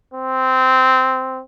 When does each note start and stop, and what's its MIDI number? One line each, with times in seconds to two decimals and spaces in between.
0.14 1.42 60